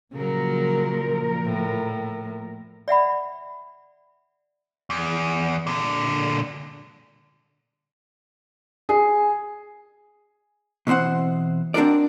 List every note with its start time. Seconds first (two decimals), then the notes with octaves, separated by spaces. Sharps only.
0.13 A#2 C#3 F3 F#3 A#4
1.45 A2
2.88 D5 E5 F#5 B5
4.90 E2
5.67 A#2 D3
8.89 G#4
10.87 B2 E3 C4 C5 F#5
11.74 C4 D4 F4 F#4 A#4 D5